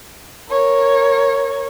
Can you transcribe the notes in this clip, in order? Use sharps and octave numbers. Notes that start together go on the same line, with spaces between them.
A#4 C#5